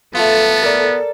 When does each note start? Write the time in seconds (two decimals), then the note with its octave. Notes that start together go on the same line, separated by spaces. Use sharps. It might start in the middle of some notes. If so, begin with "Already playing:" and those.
0.15 A3 B3 F4 A4
0.63 A#4 D5